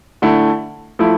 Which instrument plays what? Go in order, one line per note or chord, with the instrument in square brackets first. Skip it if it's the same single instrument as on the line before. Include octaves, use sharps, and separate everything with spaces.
[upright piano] D3 A3 E4
F3 A3 E4